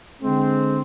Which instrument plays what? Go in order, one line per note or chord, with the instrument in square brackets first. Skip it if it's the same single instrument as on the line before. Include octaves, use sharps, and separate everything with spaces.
[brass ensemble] D3 G#3 C4